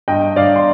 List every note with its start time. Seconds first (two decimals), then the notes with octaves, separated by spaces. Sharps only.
0.08 G2 D#5 G5
0.36 G2 D5 F5
0.56 C6